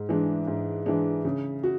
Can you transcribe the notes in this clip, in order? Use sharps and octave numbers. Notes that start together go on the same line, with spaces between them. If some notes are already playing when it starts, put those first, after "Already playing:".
Already playing: G#2
E3 G#3 D4
G#2
E3 G#3 D4
C#3
F#4